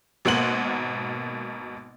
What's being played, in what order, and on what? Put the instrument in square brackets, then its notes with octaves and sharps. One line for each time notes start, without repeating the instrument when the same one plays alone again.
[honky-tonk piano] G#1 B2 A#3 F#5 C6 F#7